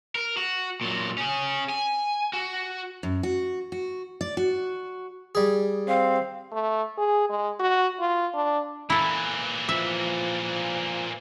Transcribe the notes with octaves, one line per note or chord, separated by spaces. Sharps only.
A#4
F#4
A#2 F#3
C#4 G#4
G#5
F#4
F#2
F#4
F#4
D5
F#4
G3 G#4
C4 F5
A3
G#4
G#3
F#4
F4
D4
A#2 E3 E4 A4
F3 E5